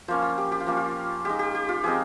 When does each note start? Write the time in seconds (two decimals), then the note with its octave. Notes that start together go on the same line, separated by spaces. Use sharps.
0.08 F3 A#3 C#4 C5
0.22 F4
0.38 G4
0.52 G4
0.60 F4
0.67 F3 A#3 C#4
0.76 F4
1.25 G#3 D#4 G4
1.39 G4
1.55 G4
1.69 F4
1.83 F3 C4 D#4 G#4